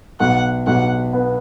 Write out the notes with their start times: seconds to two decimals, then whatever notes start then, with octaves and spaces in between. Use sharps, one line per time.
0.20 B1 F#5
0.67 B1 F#5
1.13 B3